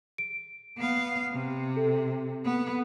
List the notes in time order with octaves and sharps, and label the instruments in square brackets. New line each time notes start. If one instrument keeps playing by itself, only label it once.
[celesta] D7
[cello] B3 F5
C3
[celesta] A4
[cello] B3